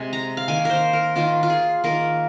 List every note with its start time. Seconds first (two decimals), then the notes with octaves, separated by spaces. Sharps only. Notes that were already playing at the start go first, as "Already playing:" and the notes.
Already playing: C3 G#3 G#5
0.13 A#5
0.37 F5
0.48 D#3 A#3 G#5
0.65 A#4 C5
0.93 A#4
1.16 D#3 A#3 F4
1.43 F4
1.50 G#4
1.84 D#3 A#3 A#4